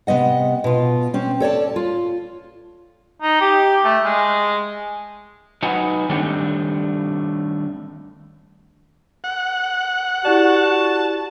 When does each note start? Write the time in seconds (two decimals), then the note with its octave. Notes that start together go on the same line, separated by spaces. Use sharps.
0.07 C3 A#3 B3 D#5 F#5
0.64 B2 F4
1.14 C4 C#4
1.40 A4 C#5 D5 A5
1.76 F4
3.22 D#4
3.41 G4
3.84 A3
4.04 G#3
5.63 F#3 D#4 F#4 B4 F#5 G#5
6.09 D#3 G3 A3 C4 D4 C#5
9.24 F#5
10.25 E4 F#4 G4 D5 A5